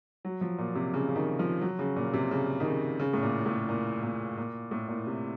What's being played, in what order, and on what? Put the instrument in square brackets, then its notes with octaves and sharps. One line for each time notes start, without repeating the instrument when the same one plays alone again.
[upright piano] F#3
F3
A#2
C3
C#3
C#3
D#3
F3
F#3
C#3
A#2
C3
C#3
D#3
C#3
C#3
A2
A#2
A2
A#2
A#2
A#2
A2
A#2
C3